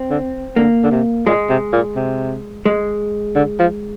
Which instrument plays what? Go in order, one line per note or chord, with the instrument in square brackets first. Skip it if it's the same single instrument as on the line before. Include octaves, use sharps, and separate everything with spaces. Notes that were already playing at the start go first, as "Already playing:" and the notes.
Already playing: [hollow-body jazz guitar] C4
[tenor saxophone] D3
[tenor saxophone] D3 [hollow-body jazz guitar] A#3
[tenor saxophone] D3
C3
[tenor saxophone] A#2 [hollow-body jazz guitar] G#3
[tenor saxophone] C3
A#2
C3
[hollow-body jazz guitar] G#3
[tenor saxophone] D3
F3